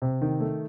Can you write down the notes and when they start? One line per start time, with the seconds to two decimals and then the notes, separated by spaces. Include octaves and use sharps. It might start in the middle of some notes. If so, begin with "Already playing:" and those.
0.02 C3
0.22 D#3
0.40 A3